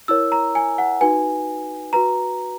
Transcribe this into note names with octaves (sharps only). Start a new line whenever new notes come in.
E4 A#4 C#5 E6
A#5
G#5
F#5
D#4 F#4 B4 G#5
F#4 B4 A#5